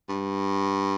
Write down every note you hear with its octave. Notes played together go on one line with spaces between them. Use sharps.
G2